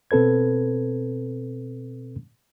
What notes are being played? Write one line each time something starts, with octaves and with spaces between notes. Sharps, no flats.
B2 C4 A4 B4 G#6